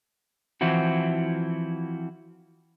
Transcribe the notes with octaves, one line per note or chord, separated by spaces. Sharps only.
E3 F3 C4 E4 F#4